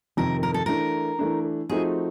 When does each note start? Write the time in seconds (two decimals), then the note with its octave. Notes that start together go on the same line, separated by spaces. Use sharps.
0.17 F2 C3 D#3 A#4
0.43 A#4
0.54 A4
0.66 E3 A3 D4 A#4
1.19 E3 A3 D4
1.69 F3 A3 C4 D#4 F#4 G#4